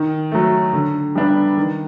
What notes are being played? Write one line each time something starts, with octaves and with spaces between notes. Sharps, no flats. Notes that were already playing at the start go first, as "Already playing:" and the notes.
Already playing: D#3
F#3 A3
D3
G3 B3 D4
D#3